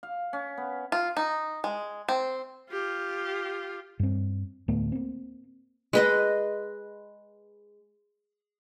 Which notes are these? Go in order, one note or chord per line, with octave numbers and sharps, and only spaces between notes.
F5
C#4
B3
F4
D#4
G#3
C4
F4 G4
G2 C4
D2 A2 A3 B3
A#3 C4
G#3 B4 D#5